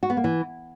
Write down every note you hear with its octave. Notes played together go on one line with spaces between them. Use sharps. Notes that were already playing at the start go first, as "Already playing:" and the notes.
F#4
B3
A#3
E3